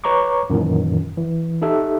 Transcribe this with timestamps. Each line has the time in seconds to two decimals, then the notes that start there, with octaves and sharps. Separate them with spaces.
0.04 B4 C#5 A#5 C#6 D6
0.50 F#2 A#2 D#3 E3
1.17 E3
1.62 D#4 G4 A4 E5